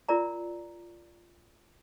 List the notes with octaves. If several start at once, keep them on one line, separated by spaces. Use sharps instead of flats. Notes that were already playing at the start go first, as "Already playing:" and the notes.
F4 A#4 D5 A#5